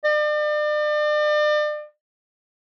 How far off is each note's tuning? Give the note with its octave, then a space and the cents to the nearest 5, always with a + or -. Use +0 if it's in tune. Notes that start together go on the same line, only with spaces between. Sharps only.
D5 +40